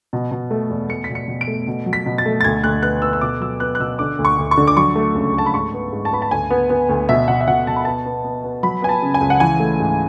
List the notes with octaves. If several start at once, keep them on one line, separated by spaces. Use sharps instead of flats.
B2
B2
A3
E2
A3 C#7
B6
B2
C#7
B2
D7
A3
B2
F#3
B6
B2
A6
A3
A6
D2 G#6
D2 F#6
B3 F#6
B3 E6
E6
B2 D6
F#3 E6
B3 F#6
F#6
B2 E6
D3 D6
D2
C#6
D2
C#6
D3
D6
F#3 C#6
A3
C#2
A3 A5
B5
G#2 C#6
B3
G#2
A5
B3 B5
A5
D2 G#5
B3
B3
D2
B2 E5
B2 F#5
E5
B2 F#5
B2 A5
B5
B3 A5
B3
B3
B3
F#3 B5
B3 G#5
A5
C#3
G#5
C#2
F#5
E3 G#5
A3
G#2